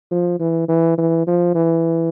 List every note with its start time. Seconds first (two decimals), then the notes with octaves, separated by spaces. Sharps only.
0.11 F3
0.40 E3
0.69 E3
0.98 E3
1.27 F3
1.55 E3